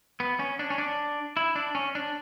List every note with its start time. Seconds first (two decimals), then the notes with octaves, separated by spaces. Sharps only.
0.20 B3
0.39 C#4
0.59 D4
0.70 C#4
0.78 D4
1.37 E4
1.56 D4
1.75 C#4
1.95 D4